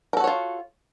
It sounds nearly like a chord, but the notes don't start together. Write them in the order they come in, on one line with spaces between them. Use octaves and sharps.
A#4 A4 F#4 C#5 F4